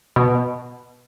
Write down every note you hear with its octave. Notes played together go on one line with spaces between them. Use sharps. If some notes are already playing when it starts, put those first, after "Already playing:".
B2